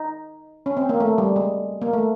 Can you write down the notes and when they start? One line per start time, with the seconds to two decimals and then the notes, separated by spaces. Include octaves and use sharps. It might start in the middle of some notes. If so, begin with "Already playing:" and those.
Already playing: D#4
0.66 C#4
0.77 C4
0.89 A#3
1.00 A3
1.18 G3
1.36 G#3
1.82 A#3
1.93 A3